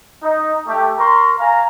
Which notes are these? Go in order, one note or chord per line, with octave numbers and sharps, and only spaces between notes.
D#4
A3 G4
A#4 A#5 C6 C#6
F5 G#5 A#5